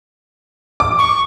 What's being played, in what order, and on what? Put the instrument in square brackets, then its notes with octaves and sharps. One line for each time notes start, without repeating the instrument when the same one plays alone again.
[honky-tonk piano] D6
[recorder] C#6